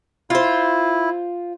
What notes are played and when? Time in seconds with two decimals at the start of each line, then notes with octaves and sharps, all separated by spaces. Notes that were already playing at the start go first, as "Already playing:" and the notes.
0.30 E4 F4 C5